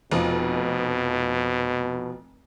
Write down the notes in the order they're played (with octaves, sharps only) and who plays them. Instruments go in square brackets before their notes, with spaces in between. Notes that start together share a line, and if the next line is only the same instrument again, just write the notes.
[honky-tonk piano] F1 F3 [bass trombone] B2